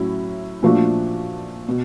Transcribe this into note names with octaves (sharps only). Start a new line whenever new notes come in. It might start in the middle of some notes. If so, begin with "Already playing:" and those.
Already playing: A2 F#3 C#4 E4
A#2 F3 A3 D4 F#4
B2